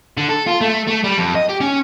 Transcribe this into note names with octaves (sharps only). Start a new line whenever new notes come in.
D3
A4
F4
A3
A3
G3
F2
D#5
G4
C#4